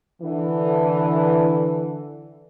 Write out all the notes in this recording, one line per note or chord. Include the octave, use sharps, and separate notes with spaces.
D3 E3